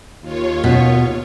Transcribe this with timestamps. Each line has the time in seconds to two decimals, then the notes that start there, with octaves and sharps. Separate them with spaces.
0.21 D#2 F4 C#5
0.64 B2